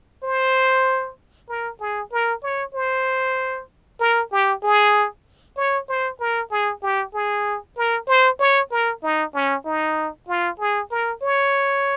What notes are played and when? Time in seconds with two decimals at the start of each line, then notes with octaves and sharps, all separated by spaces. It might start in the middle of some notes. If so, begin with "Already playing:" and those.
0.23 C5
1.49 A#4
1.80 G#4
2.12 A#4
2.43 C#5
2.75 C5
4.00 A#4
4.32 G4
4.63 G#4
5.57 C#5
5.89 C5
6.20 A#4
6.51 G#4
6.83 G4
7.14 G#4
7.77 A#4
8.08 C5
8.40 C#5
8.71 A#4
9.03 D#4
9.34 C#4
9.66 D#4
10.28 F4
10.60 G#4
10.91 A#4
11.23 C#5